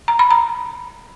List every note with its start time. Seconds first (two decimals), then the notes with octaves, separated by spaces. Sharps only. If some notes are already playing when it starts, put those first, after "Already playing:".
0.08 A#5
0.19 B5
0.31 A#5